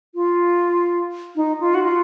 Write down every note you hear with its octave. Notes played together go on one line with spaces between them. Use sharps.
F4
D#4
F4
F#4
F4